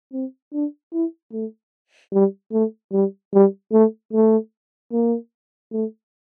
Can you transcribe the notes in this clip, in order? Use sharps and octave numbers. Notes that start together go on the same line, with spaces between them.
C4
D4
E4
A3
G3
A3
G3
G3
A3
A3
A#3
A3